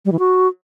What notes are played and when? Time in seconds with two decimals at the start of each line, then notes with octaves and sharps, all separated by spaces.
0.05 G3
0.12 E3
0.19 F#4